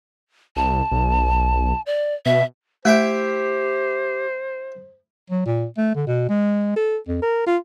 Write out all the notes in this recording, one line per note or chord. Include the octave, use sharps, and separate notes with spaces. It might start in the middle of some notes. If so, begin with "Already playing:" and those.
C2 A5
B1
D5
B2 E5
A3 E4 G4 C5 E5 G5
F#3
A#2
A3
D3
B2
G#3
A4
F2
A#4
F4